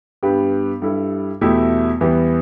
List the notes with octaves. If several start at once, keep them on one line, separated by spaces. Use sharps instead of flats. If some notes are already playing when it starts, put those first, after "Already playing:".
G2 G3 B3 G4
G2 G3 E4 A4
E2 B2 A3 E4 G4
E2 E3 G3 B3 G4